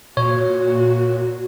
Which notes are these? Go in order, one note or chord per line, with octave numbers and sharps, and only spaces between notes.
A#2 F#4 C#5